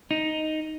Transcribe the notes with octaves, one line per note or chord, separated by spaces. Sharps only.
D#4